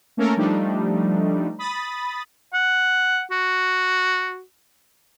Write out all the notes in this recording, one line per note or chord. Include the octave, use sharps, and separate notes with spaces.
A3 A#3 C#4 A4 A#4 C#5
F3 G3 A3 D4 D#4
B5 D#6 A6
F#5
F#4